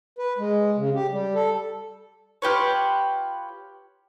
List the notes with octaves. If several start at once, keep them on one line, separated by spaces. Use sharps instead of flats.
B4
G#3
C#3
G4
G3
A4
F4 G4 B4 C#5